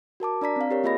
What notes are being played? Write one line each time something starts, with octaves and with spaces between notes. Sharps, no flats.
F#4 A#4 A5 D6
D4 D5 A#5 B6
C4 F5
G4 A#4 C#5
A#3 F4 G#4 D#5 B5 A#6